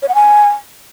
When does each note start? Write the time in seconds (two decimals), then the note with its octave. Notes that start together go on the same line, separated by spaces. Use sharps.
0.02 C#5
0.08 F#5
0.15 G#5